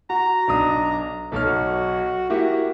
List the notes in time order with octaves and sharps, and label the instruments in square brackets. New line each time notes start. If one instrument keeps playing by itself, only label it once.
[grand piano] F#4 [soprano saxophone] A#5
[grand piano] B1 D4 D#6
[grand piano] B1 C#5 F6 [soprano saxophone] A4
[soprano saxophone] F#4
[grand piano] A#3 E4 G4 [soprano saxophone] F#4